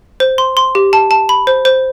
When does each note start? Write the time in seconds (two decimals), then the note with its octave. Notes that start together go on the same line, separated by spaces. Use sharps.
0.20 C5
0.38 C6
0.57 C6
0.75 G4
0.93 A5
1.11 A5
1.29 B5
1.47 C5
1.65 C5